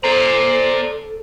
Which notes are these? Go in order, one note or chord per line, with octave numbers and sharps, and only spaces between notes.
A4 C5 D5 A#5